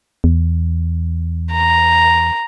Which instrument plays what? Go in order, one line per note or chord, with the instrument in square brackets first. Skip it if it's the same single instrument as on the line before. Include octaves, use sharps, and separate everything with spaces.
[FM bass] E2
[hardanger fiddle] A#5